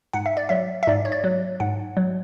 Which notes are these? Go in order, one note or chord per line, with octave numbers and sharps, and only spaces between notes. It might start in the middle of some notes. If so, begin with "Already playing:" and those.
G#2 F#5
E5
D5
F#3 E5
E5
G#2 D5
C#5
D5
F#3
G#2 F#5
F#3